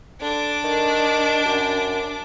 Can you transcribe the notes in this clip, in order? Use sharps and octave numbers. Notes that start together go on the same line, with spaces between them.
D3 D4 D6
D#3
F#2